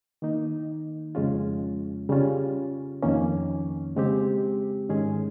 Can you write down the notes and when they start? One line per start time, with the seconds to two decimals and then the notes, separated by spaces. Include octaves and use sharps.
0.22 D#3 A#3 D#4
1.15 F2 C#3 G#3 C#4 F4
2.09 C#3 G3 C#4 F4
3.03 F2 D#3 A#3 C#4
3.96 C#3 G#3 C4 G4
4.89 G#2 D#3 G#3 C#4 G#4